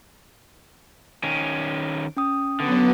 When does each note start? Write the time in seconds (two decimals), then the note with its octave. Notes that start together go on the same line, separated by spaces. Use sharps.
1.23 D#3 C#4 D7
2.17 C#4 G5 D#6
2.60 D3 F#3 B3